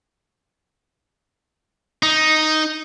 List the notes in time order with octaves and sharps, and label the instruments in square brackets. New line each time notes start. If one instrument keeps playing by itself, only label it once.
[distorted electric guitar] D#4